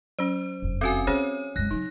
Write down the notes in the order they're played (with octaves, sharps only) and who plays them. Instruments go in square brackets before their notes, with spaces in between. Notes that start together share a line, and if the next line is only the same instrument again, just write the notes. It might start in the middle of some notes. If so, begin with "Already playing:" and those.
[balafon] F#3 C#4 [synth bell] C5
[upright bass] F1 F#2
[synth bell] C4 C#4 G#5 [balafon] F#4 A4
[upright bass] C4 F4 [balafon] C#4 G#4 C5 [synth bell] C#5
[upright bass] F#1 G#3 [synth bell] F#6 A#6
[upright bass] C#3 F#3 [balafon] D#4